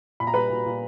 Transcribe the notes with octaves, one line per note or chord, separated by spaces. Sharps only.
A#2 B5
A#5
G3 B4 B5
A#2
A#2